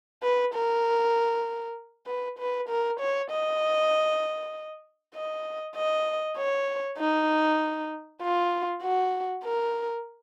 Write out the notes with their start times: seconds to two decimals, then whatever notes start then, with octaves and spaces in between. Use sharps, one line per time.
0.23 B4
0.54 A#4
2.07 B4
2.39 B4
2.69 A#4
3.00 C#5
3.31 D#5
5.15 D#5
5.76 D#5
6.38 C#5
6.98 D#4
8.22 F4
8.82 F#4
9.44 A#4